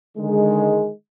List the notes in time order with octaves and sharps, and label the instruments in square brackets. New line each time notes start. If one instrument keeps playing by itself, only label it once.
[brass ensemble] D3 D#3 G#3